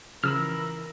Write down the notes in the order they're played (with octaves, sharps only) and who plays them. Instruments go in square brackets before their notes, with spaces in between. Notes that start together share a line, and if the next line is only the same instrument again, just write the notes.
[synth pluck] C#3 F3 [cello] E3 A#4 [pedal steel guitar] B5 E6 F6